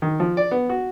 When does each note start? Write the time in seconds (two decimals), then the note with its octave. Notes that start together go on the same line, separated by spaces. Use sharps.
0.02 D#3
0.20 F3
0.37 D5
0.51 B3
0.69 F#4